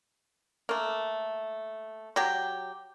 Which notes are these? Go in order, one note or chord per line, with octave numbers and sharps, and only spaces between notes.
A3 A#3
F#3 G4